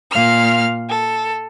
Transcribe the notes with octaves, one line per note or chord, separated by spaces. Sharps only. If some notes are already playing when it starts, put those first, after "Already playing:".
A#2 F5 F6
A4